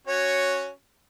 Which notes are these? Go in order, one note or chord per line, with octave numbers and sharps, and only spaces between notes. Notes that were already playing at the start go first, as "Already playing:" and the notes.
C#4 F#4 C#5